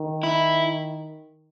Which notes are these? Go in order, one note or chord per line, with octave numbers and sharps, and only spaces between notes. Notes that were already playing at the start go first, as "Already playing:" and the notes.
Already playing: D#3
E4